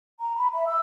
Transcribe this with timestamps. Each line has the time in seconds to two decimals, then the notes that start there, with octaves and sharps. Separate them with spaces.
0.21 A#5
0.36 B5
0.53 E5
0.67 E6